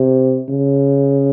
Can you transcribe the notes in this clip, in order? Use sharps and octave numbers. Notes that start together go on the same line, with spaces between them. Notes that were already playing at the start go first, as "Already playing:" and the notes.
Already playing: C3
C#3